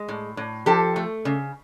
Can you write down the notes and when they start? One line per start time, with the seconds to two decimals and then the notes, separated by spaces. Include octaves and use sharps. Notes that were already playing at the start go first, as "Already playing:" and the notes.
Already playing: G#3
0.09 A2
0.37 A2
0.66 F3 G4 A4
0.96 A3
1.25 C#3